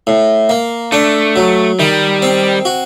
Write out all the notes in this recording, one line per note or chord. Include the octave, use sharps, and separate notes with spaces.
A2
A#3
A3 D4
F#3
D#3 G3
C4
F#4